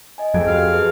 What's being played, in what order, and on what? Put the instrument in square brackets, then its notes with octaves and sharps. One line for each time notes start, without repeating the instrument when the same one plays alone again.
[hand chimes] D#5 G#5
[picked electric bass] F2 [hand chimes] G#4 G#6 D7
[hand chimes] F#4 G4 [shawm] F5
[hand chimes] G#4 B4